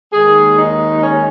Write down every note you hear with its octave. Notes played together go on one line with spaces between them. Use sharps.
D#2 D#3 G#3 G#4
D#4
C#4